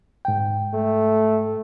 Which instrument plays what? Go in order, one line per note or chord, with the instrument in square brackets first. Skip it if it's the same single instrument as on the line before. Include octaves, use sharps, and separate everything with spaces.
[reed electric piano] G#2 G5
[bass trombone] A3